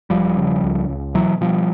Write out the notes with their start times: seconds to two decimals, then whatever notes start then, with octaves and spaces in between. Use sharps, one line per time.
0.10 E1 F3 G3
0.37 C#3
0.63 C#2
0.89 C#2
1.14 B2 E3 F#3
1.41 B2 F3 G3